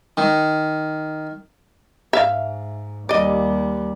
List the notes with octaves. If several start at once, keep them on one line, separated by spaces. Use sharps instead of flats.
D#3
G#2 E5 F5
D#2 G3 D5 D#5